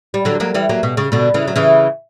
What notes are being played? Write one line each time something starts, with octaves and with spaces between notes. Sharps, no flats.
G3
D3 F#3
F#3 A#3
E3 G3
F#3 A#3
B2
C#3
B2 D3
C#3 E3
F#3
C#3 E3